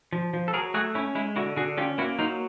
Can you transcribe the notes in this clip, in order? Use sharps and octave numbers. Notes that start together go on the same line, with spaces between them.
F3
F3
A4
F#3 G#4 A#4
A3 F#4 G#4
C#4 E4
G#3 E4
D3 E4 F#4
D3 F#4 G#4
C#4 F4 G4
A#3 E4 F#4
F#3 D#4 F4